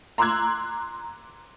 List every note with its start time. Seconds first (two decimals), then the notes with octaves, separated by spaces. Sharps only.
0.18 A#5 C6 D6 E6 F#6 G#6